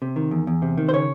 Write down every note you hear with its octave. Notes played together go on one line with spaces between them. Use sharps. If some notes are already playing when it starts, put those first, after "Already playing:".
C3
D#3
E2
E2
C3
D#3
C5
C#3 C#5